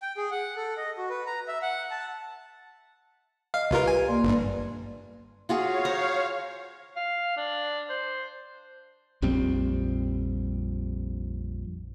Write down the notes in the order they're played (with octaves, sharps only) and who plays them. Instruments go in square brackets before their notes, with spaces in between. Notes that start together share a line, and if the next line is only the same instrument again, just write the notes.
[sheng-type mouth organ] G5
G#4
F#5
A4
D#5
F#4
B4
A#5
E5
F#5
A5
[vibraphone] D#5 [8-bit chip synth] F5
[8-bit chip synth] C2 F4 A#4 [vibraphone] G4 B4
[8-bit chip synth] G#5
[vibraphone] A#3 D5 C6
[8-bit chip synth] G1 G2
[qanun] F4 F#4 G#4 [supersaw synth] C#5 F5
[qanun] C5 A#5
[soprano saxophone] F5
D4
C5
[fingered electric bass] A#1 F2 G3 C4